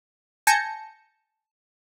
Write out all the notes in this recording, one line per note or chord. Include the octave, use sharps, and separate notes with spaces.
G#5 A5 G6 G#6 A#6 C#7